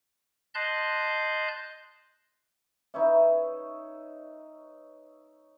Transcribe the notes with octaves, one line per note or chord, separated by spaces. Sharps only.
D#5 A5 C6 F#6 G6
D#4 B4 C#5 E5